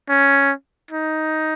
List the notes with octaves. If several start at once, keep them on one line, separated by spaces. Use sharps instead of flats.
C#4
D#4